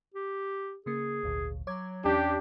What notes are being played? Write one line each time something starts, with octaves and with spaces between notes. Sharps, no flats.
G4
C#3 A#3 G#4
G#1 D2 A#2
F#3 C#5 D6 G#6
E2 C#4 D4 G4